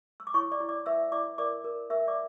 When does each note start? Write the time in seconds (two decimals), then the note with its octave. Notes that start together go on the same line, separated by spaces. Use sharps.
0.20 E6
0.27 D6
0.34 E4 C#5 C#6
0.51 D5 D6
0.60 E4
0.69 D5 D6
0.86 B4 E5 E6
1.12 E4 D5 D6
1.38 A#4 D5 D6
1.64 A#4
1.90 A#4 E5 E6
2.07 D5 D6